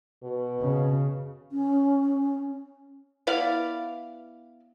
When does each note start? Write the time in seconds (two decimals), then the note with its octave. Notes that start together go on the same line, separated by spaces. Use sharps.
0.23 B2
0.60 C#3
1.50 C#4
3.27 B3 E4 D5 F5